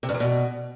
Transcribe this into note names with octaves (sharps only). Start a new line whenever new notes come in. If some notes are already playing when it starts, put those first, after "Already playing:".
C3
G2
E2
B2